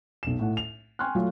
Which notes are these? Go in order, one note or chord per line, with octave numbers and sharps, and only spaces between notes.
B1 E7
A2 F#5
F7
G5 G#5 C6 C#6 F6 F#6
F#3 A3 F4